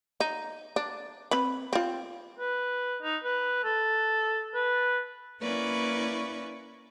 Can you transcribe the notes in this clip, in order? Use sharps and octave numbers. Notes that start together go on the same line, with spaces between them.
D#4
D4
C4 B4 B5
C4 F4
B4
D#4
B4
A4
B4
A#3 C#4 E4 B4 D5 C#6